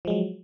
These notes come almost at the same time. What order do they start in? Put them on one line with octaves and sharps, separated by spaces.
F3 G#3 F#3